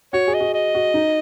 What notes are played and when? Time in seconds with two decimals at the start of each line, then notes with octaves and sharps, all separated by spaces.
0.13 F#4 C#5
0.28 G#4
0.34 D#5
0.40 F#4
0.54 D#5
0.75 F#4
0.94 D#4